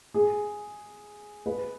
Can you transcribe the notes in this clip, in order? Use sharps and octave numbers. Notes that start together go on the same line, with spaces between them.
G#4
B4